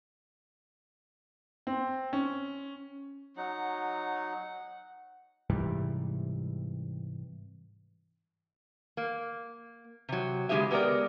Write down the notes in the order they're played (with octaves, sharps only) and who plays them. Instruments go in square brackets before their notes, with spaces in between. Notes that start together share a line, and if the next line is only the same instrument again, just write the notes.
[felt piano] C4
C#4
[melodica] F#3 D#4 [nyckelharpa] F#5
[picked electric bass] G#2 C3 E3 G3
[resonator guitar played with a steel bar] A#3
C3 F#3
C#3 G#3 C4 G4 G#4 E5
G#3 B3 G4 A4 A#4 D5